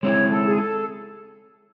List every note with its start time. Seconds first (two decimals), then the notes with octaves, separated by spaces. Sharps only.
0.02 G#3 C4 E4 C#5
0.30 A4
0.46 G#4
0.56 A4